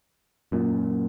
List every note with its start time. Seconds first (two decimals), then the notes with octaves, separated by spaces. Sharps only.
0.52 F#2 A#2